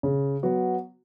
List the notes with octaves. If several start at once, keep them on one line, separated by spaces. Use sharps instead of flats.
C#3
F#3 B3 F#4